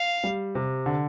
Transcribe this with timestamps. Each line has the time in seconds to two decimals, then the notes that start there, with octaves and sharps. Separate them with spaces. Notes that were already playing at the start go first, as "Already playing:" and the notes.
Already playing: F5
0.24 G3
0.55 C3
0.86 D3